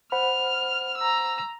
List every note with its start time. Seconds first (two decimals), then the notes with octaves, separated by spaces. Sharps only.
0.12 C5 F#5 B5 F6
0.98 A#5 E6